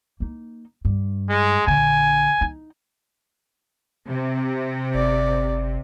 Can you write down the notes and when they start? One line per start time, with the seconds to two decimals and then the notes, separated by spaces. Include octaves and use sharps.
0.20 A#3 D#4
0.85 G2
1.29 G#3
1.66 A#1 D3 G#5
2.41 D#4
4.07 C3
4.94 G1 D5